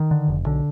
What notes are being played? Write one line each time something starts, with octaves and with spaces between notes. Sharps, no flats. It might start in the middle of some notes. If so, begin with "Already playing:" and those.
Already playing: D#3
D3
F1
B1 D3